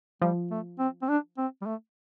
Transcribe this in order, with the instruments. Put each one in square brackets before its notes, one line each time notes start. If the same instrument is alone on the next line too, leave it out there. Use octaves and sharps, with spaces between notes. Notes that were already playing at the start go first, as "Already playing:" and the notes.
[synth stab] F3 [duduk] G3
[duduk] A3
C4
C4
D4
C4
G3
A3